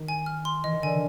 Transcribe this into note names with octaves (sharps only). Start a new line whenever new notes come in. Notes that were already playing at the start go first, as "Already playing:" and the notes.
Already playing: D#3
G#5
F6
C6
E3 D#5
D#3
D3 G#5
C#3